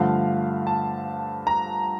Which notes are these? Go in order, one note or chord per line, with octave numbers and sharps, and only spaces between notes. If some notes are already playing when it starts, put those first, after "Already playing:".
Already playing: G2 D3 F3 A3 F5
A5
A#5